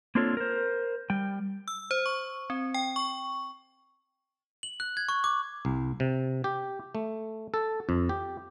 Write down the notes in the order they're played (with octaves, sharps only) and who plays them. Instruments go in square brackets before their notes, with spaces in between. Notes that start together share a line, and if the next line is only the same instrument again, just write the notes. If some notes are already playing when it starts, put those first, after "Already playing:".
[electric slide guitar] A#3 C4 D4 F4 A4 C#5
A#4 C5
G3 G5
[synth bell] E6
C5
C#6
C4
G5
C#6
[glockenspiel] F#7
F#6
G#6
C#6
D6
[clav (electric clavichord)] C2
C3
G4
A3
A4
F2
G4